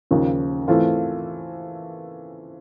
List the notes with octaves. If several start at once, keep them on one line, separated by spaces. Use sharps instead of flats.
D#2 C#3 F3
E3 A3 C4 F4